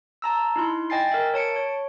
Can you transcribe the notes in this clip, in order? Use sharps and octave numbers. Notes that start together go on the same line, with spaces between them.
A5 A#5 E6
D#4 E4 C6
D#5 G5 G#5 A6 C7
A#4 E5
C#5 A5 C#7 D7
C#5